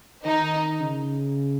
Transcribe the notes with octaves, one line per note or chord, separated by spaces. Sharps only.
D#3 D#4
C#3